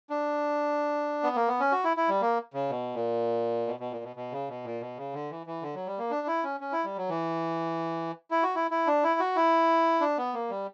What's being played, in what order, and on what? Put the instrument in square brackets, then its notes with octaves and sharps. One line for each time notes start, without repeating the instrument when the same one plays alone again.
[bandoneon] D4
B3
A#3
B3
C#4
F#4
E4
E4
G3
A#3
C#3
B2
A#2
B2
B2
A#2
B2
B2
C#3
B2
A#2
B2
C#3
D3
E3
E3
D3
F#3
G3
A#3
D4
E4
C#4
C#4
E4
G3
F#3
E3
E4
F#4
E4
E4
D4
E4
F#4
E4
D4
B3
A#3
G3